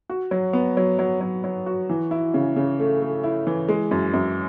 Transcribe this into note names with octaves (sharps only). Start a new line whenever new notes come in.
F#4
F#3
B3
F#3
F#3
F#3
F#3
F#4
E3
E4
C#3
C#3
A3
A3
E4
E3
G#3
F#2
F#2